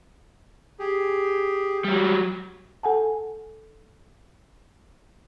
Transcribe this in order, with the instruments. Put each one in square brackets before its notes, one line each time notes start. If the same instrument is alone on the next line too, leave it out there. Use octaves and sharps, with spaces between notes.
[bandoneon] G4 G#4
[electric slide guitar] F#3 G3
[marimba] A4 F#5 G#5 A5